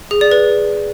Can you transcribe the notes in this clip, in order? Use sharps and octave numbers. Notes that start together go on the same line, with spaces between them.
G#4
D5
B4